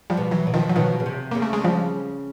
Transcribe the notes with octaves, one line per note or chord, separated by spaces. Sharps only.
F3 G3
B2
E3 F#3
B2
D#3 F3
F#3
B2 D#3 F3
C#3
C3
C#3 A#3
A3
G#3
F3 G3